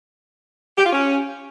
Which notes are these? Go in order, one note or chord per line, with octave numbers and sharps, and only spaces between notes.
G4
F4
C#4